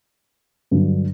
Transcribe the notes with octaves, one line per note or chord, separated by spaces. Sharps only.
G2 D3 F#3